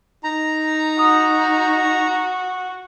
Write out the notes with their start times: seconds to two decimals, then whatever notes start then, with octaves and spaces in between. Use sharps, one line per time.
0.24 D#4 A#5
0.99 F#4 D#6